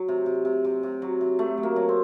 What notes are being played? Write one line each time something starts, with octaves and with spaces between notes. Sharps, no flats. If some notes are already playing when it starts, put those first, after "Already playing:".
Already playing: F#3
C3
C3
C3
C3
C3
F#3
C3
F#3 A3
F#3
A#3
F#3
C4